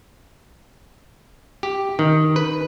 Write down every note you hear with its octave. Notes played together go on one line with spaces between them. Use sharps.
G4
D#3
B4